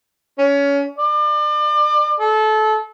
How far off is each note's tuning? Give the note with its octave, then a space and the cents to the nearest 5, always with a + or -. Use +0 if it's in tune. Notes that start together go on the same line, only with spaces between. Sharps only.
C#4 +25
D5 +35
A4 -25